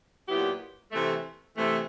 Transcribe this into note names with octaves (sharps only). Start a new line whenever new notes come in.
A#2 F#3 B3 E4 G4
C3 E3 A3
C3 E3 A3